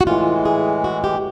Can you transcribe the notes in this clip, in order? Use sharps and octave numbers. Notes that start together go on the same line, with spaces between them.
F#4
A2 E3 G#3 F4
G#4
F#4
G4